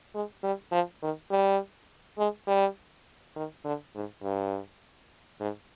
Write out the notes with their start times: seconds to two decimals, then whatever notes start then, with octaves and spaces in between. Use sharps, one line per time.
0.14 G#3
0.43 G3
0.72 F3
1.02 D#3
1.31 G3
2.18 G#3
2.48 G3
3.36 D#3
3.65 D3
3.95 G#2
4.23 G2
5.40 G#2